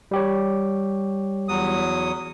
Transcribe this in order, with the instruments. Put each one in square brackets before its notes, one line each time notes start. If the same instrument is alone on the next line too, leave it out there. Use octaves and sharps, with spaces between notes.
[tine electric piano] G3 G4 C#5
[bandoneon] E2 F#3 D#6